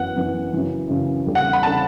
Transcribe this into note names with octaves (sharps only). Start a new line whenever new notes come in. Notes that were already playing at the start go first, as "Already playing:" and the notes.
Already playing: F#2 E3 B3 F#5
F#2 E3 B3
F#2 C#3 E3
F#2 C#3 E3
E2 C#3 G3 D4 A4
F#5
B5
C#3 G3 D4 A4 A5